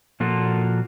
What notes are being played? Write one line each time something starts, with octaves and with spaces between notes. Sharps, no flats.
A#2 F3 A#3 F4 F#4 A4